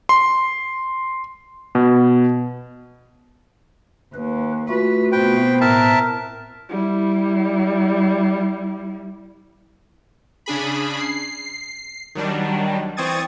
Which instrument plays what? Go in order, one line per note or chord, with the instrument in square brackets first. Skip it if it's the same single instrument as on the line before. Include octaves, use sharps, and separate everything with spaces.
[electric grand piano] C6
B2
[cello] D#2 [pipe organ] B4
[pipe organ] A3 F4 F#4 [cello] B4
[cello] B2 C4 [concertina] B4 G5
[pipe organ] A2 F#6 [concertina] A#4 E5 A5
[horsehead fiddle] G3 E4
[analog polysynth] C#3 D4 G#4 B5
C7
D#3 F#3 G3 D4
E3 C4 C#6 D#6 G#6 A6